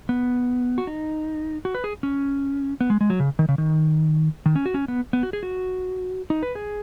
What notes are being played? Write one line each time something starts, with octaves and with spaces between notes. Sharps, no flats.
B3
F#4
D#4
F#4
B4
G#4
C#4
B3
G#3
G#3
F#3
C#3
D#3
C#3
D#3
D#3
C#4
F#4
C#4
B3
B3
F#4
G#4
F#4
D#4
B4
G#4